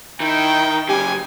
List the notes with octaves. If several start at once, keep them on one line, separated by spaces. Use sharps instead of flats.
D#3 E4 G5
F#2 C#3 G4 G#5